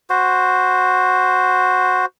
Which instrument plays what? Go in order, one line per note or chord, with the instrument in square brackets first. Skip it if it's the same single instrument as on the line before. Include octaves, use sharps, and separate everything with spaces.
[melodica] F#4 C5